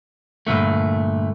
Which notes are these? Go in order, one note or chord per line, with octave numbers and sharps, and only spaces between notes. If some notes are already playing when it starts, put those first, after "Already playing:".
G2 A#2 D3 A3